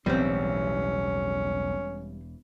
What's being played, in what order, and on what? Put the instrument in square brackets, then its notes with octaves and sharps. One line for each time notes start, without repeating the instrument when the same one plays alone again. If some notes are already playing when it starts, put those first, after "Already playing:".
[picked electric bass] E1 E3 [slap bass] B1 E2 A2 [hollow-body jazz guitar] G3 C4 [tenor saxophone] C#4